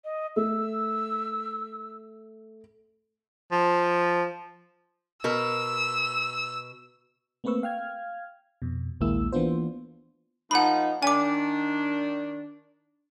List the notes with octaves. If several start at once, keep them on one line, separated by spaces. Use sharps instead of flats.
D#5
A3 E6
F3
B2 A#4 E6
A3 A#3 C4 B4 C#6 E6
F5 G5 F6 G#6
F2 B2
A#1 D#2 G#3 A#3 E4 E6
E3 A#3 B3 D4 F4 C5
F3 A#3 D#4 F#5 B5
D#3 D4 G#5 D6